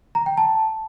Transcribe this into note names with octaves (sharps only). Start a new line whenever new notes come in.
A#5
G5
A5